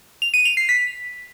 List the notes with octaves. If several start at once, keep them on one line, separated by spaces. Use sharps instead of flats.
F7
D#7
F7
C7
B6